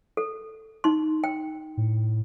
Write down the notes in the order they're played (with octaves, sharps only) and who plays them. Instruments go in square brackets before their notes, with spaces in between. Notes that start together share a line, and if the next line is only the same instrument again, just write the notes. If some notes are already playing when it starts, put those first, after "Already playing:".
[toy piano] A4
D#4 C6
G5
[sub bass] A2